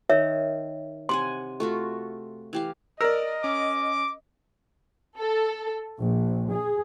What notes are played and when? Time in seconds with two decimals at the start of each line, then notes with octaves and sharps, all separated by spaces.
0.10 D#3 A#4 C#5 E5
1.09 C3 F#5 G#5 C6
1.60 A3 F4 F#4
2.53 E3 G4 F5
3.01 A#4 D5 D#5 E6
3.44 C#4 D6
5.18 A4
5.99 A#1
6.51 G#4